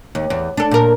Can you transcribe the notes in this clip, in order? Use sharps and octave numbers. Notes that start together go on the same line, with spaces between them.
D#2
E2
D4 A4
A#2 A#4